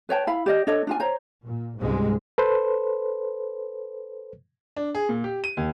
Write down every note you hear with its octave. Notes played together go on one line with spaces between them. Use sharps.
B4 C#5 G5 A5
E4 F5 B5
G4 D5 D#5
D4 A4 C#5 D#5
D4 F4 G#5
C5 C#5 A#5
A#2
C#2 G#2 C3 G3 G#3
A4 B4 C5
D4
G#4
A#2
G4
D#7
D#2